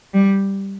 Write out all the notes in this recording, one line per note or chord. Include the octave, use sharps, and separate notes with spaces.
G3